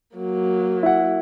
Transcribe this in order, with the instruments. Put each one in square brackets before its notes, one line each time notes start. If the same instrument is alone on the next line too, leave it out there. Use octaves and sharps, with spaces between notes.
[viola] F#3 A#3
[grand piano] E4 F#5